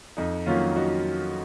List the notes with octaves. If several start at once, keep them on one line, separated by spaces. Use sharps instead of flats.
F2 D#4
D#3 F#3 A#3 C#4 F4
D#4 F#4